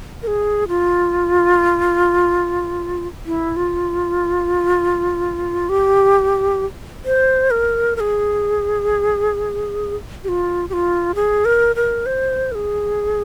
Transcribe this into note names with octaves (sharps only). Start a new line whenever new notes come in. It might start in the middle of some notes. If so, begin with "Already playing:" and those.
A#4
G#4
F4
E4
F4
G4
C5
A#4
A#4
G#4
G4
F4
G4
F4
G#4
A#4
A#4
C5
A#4
G#4